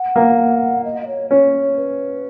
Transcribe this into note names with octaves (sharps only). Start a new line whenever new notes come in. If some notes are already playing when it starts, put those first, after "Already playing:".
Already playing: F#5
A#3
D#5
D#5
C#5
C#4 C#5
B4